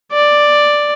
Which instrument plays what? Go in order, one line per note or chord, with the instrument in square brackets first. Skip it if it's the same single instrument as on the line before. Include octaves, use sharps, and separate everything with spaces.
[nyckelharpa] D5